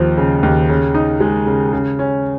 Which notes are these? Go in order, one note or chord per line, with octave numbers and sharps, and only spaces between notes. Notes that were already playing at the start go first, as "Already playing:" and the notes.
Already playing: D#2 F3
C#3
D#2
C#3
D#4
G#3
C#3
C#3
C#4